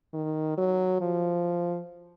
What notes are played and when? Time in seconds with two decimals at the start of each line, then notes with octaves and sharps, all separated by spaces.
0.14 D#3
0.58 F#3
1.01 F3